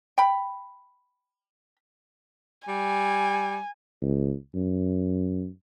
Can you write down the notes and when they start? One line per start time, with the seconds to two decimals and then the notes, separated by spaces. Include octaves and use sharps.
0.18 G5 B5
2.68 G3 G#5
4.02 C#2
4.55 F#2